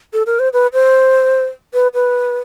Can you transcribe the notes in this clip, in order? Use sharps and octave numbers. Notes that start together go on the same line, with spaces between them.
A4
A#4
C5
B4
C5
B4
B4